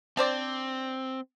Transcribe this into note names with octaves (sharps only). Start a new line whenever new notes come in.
C4 D4 C5 D5